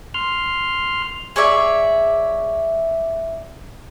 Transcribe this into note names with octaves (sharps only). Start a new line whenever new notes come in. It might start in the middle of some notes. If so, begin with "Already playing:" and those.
C6 F6
G#4 C#5 D5 E5